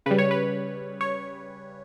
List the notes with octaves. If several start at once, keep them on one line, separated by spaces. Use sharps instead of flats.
C#3 G3 B4
C#5
B4
C#5